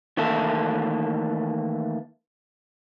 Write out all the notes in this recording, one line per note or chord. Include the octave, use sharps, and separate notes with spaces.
D#3 E3 A3 A#3 E4 A4